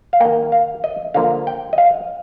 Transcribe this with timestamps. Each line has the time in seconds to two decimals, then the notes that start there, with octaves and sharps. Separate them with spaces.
0.13 F5
0.20 D#3 A#3 G5
0.52 F5
0.84 D#5
1.14 D3 F3 A#3 F5
1.47 G5
1.73 D#5
1.78 F5